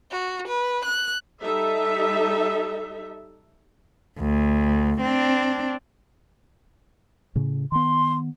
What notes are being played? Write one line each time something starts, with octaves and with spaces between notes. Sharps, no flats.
F#4
B4
F#6
G3 D#4 A4 E5
D2
C4 D4
A2 C#3
D#3 B3 C6